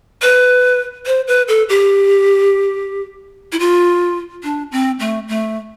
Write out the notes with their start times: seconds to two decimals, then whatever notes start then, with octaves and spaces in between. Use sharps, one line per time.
0.22 B4
1.06 C5
1.27 B4
1.48 A4
1.69 G4
3.52 E4
3.60 F4
4.43 D4
4.72 C4
5.00 A3
5.28 A3